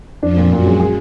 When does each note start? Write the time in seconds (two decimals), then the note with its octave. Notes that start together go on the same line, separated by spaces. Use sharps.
0.22 F2 F3 D4
0.37 A#2
0.51 F#2 A#2 F#3
0.66 G#3
0.80 G#4